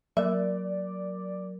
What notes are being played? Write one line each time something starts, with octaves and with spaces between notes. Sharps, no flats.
F#3 A#4 D5 E5